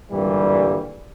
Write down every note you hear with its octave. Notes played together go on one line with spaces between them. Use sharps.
G#1 G2 A#2 D3 E3 G3